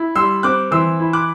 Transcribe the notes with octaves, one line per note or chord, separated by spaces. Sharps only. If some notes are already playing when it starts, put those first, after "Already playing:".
Already playing: E4
G3 C6 E6
C4 D6 F#6
E3 C6 E6
E4
D6 F#6